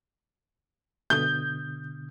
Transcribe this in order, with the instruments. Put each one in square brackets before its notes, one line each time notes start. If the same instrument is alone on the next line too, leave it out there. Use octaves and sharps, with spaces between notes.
[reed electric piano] B2 D3 D#6 [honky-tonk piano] G6